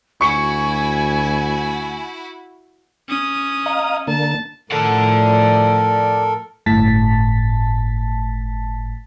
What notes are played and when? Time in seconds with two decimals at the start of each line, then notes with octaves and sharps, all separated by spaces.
0.21 D2 E4 F#4 G#5 C#6 C#7
3.09 C#4 D#6
3.66 D#5 F5 A#5
4.07 D3 A#3 A5
4.72 A2 F3 A4 A#4 D5 F#5
6.66 G1 A2 A5 A6 B6